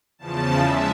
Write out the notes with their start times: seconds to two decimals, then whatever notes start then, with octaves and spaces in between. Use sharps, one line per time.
0.18 E2 C#3 F3 A5
0.61 G#3 E5